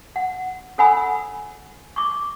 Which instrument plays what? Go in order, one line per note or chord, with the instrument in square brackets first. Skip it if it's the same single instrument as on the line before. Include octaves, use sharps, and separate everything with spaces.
[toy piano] F#5
A4 C#5 F#5 G#5 B5 E6
C#6 D6